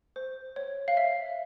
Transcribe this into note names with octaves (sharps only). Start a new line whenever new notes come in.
C5
C#5
F5
E5